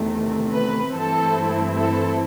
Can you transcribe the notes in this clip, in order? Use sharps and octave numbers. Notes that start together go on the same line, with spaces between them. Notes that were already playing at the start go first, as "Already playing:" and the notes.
Already playing: E2 C3 D#3 A3
B4
G2 E3 A3 C4 E4 A4
A4